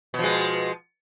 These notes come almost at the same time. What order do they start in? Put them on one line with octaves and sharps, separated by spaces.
B2 F3 G#3